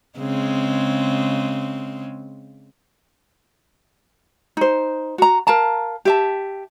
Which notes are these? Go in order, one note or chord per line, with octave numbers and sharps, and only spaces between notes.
C#3 G#3 C4
D#4 C5
F#4 A#5
A#4 F5 A5 A#5
G4 E5 A5